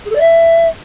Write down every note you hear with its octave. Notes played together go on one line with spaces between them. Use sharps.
G#4
A4
D5
E5